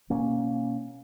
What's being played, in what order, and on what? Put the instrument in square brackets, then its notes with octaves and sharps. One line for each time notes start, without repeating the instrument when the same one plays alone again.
[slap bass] B2 A#3 C#4